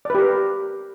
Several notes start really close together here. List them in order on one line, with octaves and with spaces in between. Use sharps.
D5 B4 G4 A#4